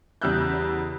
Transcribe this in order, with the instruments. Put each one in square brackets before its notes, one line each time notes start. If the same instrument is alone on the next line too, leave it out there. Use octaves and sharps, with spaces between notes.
[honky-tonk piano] E2 C#3 G3 E6 F#6 G6